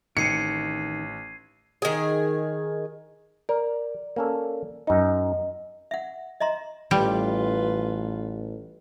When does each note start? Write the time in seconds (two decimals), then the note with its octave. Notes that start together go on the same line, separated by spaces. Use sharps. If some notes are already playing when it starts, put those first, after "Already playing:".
0.17 A1 D#3 C4 G#6 C7 C#7 D#7
1.82 D#3 G#4
3.49 A#4 D5
4.16 A#3 C#4 A4
4.87 F#2 D#4 D#5
5.91 E5 F#5
6.40 D#5 E5 A#5 C6
6.91 A1 G3 F4 B4